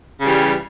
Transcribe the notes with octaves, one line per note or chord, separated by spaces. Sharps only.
C#3 E3 G3